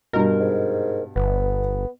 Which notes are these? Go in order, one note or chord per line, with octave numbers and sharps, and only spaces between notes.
G2 B2 A#4
G#2
G1 B3